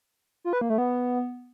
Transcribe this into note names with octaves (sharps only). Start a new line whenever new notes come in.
F4
B4
A#3
A3
B3